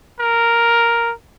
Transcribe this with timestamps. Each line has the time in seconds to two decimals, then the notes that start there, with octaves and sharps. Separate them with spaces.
0.20 A#4